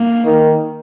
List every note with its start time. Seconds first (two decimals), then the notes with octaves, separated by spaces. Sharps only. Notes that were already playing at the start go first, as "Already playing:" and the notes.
Already playing: A#3
0.24 D#3